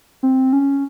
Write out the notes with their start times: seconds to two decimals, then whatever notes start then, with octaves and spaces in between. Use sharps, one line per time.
0.23 C4
0.53 C#4